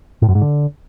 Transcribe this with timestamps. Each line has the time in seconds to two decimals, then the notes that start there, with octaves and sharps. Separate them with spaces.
0.22 A2
0.29 F#2
0.35 G#2
0.42 D3